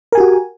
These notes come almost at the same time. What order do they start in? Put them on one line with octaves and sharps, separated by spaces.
A#4 G#5 G4 F#4